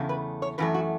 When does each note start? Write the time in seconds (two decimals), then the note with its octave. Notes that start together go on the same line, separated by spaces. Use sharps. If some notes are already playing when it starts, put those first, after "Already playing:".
Already playing: E2 C#3 A3
0.09 B4
0.42 C#5
0.58 F#2 E3 A3 B4
0.74 F#4